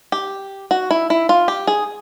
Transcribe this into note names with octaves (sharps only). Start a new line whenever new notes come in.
G4
F#4
E4
E4
F4
G4
G#4